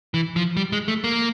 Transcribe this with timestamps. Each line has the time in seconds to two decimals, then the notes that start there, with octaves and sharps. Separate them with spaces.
0.14 E3
0.36 F3
0.57 G3
0.72 G#3
0.88 A3
1.04 A#3